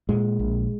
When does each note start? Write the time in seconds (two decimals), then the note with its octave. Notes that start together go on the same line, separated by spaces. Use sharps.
0.09 A#2 G#3
0.39 A#1